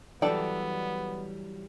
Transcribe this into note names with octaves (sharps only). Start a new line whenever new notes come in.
E3 F#3 G3 B3 A4 D5 G5